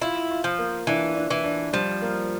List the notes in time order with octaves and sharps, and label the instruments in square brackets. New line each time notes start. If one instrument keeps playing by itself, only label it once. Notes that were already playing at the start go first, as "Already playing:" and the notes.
[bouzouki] E4 [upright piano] F4
[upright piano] F4
[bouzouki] F3
[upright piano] A#3
[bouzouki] E3 [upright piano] D4
[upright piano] D4
[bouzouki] E3
[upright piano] D4
[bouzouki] F3 [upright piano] G3
[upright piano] A#3